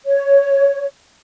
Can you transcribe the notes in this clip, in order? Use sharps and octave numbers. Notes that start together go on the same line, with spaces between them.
C#5